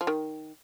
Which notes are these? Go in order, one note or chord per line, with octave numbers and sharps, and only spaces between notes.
F3
D#3